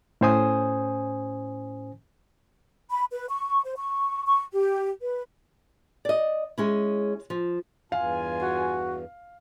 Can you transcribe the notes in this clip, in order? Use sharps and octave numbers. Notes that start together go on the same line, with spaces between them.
A2 C#4 C5 G#5 D#6
B5
B4
C#6
C5
C#6
C#6
G4
B4
D5 D#5
G#3 C#4 E4
F3
E2 G2 F4 F5 G#5
F#4